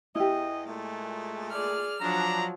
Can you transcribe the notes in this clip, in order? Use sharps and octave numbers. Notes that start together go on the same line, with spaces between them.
E2 E4 G4 D#5
A#2 G#3 A3
G#4 D5 F6
F3 F#3 D4 A#5